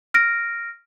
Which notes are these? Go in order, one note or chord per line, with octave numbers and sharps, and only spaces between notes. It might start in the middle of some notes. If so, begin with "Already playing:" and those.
F6 A#6 D7